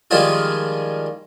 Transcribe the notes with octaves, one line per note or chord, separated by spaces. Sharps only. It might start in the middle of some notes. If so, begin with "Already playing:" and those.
D#3 F3 G3 G#3 F4 G#4